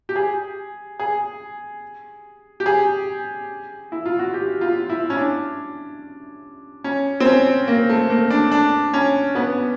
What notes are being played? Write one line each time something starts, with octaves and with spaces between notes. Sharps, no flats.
G4
G#4
G#4
G4
G#4
E4
F4
F#4
G4
F4
E4
C#4
D4
C#4
C4
C#4
A#3
A3
A#3
D4
D4
C#4
B3